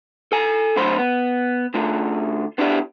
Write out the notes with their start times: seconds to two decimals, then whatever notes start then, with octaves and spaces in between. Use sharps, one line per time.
0.32 A4 G#5
0.77 D3 F#3 A3 C5 B5 C6
0.98 B3
1.74 D3 A3 F4
2.58 B3 D4 E4 G4 D5